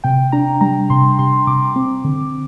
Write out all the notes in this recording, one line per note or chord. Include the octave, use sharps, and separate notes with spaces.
C3 G5
D4 A#5
G3 A#5
C3 C6
C3 C6
C3 D6
C4
D3